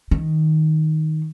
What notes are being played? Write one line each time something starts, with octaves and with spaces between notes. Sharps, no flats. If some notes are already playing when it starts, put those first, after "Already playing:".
D#3